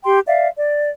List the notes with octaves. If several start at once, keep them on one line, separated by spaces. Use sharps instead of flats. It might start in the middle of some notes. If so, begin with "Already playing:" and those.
G4 G5 C6
D5 E5 F5
D5